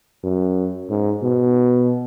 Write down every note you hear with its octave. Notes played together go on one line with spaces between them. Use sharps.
F#2
G#2
B2